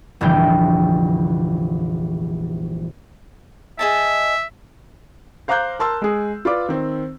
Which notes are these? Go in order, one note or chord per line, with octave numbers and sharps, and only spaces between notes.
F1 A#1 D3 E3 G3 G5
G#4 D#5 E5 A5
C5 F5 A#5 D6 F#6 G6
A#4 A5 C6 E6
G#3 G#4
F4 B4 D5 D6
D#3 C4